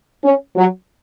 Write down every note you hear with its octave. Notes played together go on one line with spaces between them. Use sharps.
C#4
F#3